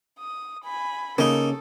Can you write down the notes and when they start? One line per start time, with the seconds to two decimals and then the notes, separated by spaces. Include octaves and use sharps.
0.19 D#6
0.64 G#5 B5
1.18 C#3 A#3 D#4 A4